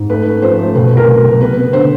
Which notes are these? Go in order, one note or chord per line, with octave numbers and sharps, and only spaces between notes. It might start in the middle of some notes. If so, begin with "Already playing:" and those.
Already playing: G#2
A3 B4
C#4
F3 C5
A3
B2 B4
C2
A#4
F#3
B4
C2
B3 B4
B3
D3 C5